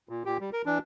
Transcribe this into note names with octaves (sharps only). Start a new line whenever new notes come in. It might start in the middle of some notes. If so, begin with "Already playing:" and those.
A#2
A#2 G4
G3
A#4
E3 D4